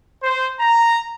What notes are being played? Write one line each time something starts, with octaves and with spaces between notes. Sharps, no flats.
C5
A#5